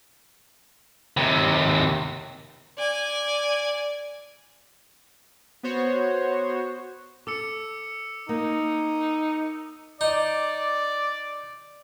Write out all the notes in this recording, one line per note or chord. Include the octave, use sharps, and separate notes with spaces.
D#2 C3
D5 G#5
B3 F#4 C5 C#5
A4 D6 E6 C#7
A#3 D#4
D#4 D5